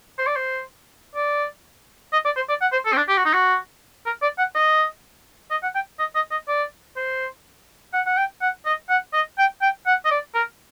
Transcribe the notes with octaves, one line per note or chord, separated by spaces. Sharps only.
C5
D5
C5
D5
D#5
D5
C5
D5
F#5
C5
A4
C4
D4
G4
F#4
D#4
F#4
A#4
D5
F#5
D#5
D#5
F#5
G5
D#5
D#5
D#5
D5
C5
F#5
F#5
G5
F#5
D#5
F#5
D#5
G5
G5
F#5
D#5
D5
A#4